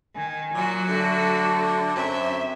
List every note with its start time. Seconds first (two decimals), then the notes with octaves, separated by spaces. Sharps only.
0.16 D#3 G#5
0.55 A#2 F#3 F#4
0.89 D3 A3
1.96 F#2 C4 E5